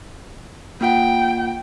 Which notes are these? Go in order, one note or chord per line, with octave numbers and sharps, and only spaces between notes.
A#3 F4 F#5 G5